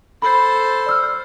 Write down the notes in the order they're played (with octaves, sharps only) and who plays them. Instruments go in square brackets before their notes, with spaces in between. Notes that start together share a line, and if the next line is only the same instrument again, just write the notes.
[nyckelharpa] A4 C5 [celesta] B5
[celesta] D5 E6 F6